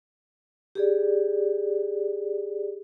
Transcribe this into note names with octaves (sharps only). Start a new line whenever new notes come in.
G4 G#4 D5